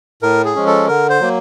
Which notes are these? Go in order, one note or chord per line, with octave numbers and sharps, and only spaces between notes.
A2 A#4
G#4
F3 G#3 C#4
A4
D3 A#4
C5
F#3 A#3